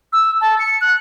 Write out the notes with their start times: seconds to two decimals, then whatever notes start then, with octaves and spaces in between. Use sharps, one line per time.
0.13 E6
0.41 A5
0.59 C#7
0.81 F#6